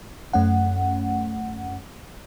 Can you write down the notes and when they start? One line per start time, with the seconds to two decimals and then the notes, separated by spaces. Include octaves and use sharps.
0.33 F#2 A3 C#4 F#5